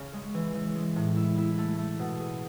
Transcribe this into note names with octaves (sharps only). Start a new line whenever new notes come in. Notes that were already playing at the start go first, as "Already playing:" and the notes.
Already playing: C#3 C#4
G#3
E3
E3
G#3
A2
E4
E4
A3
A3
B2
G#4